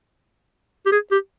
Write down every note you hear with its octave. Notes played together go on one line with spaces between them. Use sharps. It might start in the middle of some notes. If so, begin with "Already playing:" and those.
G4
G#4
G4